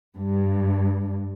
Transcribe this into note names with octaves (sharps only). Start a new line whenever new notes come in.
G2